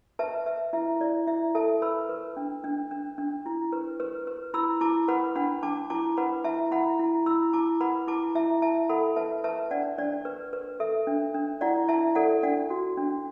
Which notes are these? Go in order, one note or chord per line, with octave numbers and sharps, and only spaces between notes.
B4 E5 A5
B4 E5
E4 E5
E4 D5
E4 E5
A4 E5 A5
B4 B5 E6
B4
D4
D4
D4
D4
E4
B4
B4
B4
E4 B5 E6
E4 A5 D6
B4 F#5 B5
D4 F#5 B5
D4 A5 D6
E4 A5 D6
B4 F#5 B5
E4 E5 A5
E4 F#5 B5
E4
E4 B5 E6
E4 A5 D6
B4 F#5 B5
E4 A5 D6
E4 E5 A5
E4 E5 A5
A4 F#5 B5
B4 E5 A5
B4 E5 A5
D4 D5 F#5
D4 D5
B4
B4
A4 E5
D4
D4
E4 D5 F#5
E4 E5 A5
A4 D5 F#5
D4 D5 F#5
F#4
D4